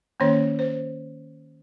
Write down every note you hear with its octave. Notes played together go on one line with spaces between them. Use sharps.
D#3 A#3 C#4 C#5
C5